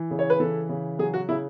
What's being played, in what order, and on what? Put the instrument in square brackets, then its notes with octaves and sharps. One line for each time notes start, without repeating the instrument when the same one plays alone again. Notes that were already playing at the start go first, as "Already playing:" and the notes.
Already playing: [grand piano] E3
C#3
C#5
B4
E3 A4
C#3
F#3 G#4
F#4
C#3 E4